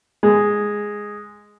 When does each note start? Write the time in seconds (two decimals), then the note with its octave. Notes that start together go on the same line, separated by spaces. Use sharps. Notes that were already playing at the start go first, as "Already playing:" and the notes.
0.23 G#3